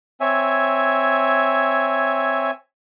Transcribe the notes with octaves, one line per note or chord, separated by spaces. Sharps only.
C4 C#5 E5 G#5